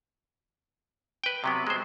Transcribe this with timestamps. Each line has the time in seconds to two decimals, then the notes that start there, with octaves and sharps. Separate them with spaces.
1.24 B4 G5
1.44 C3 F#3 B3
1.67 G#3 C5